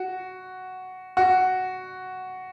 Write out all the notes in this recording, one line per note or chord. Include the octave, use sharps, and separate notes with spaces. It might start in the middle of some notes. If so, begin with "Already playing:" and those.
Already playing: F#4
F#4